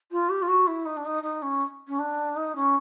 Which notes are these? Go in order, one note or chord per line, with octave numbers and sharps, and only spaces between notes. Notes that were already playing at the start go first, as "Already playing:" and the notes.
F4
G4
F4
F#4
E4
D#4
D4
D#4
D#4
C#4
C#4
D4
D#4
C#4